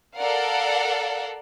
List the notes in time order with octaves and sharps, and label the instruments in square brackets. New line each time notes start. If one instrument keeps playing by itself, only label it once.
[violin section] A4 A#4 D5 F5 F#5